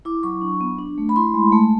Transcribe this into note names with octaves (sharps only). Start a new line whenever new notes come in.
E4 D6
F#3 C#6
D4
B3
D4
A3
B5
E4 C6
G#3
A3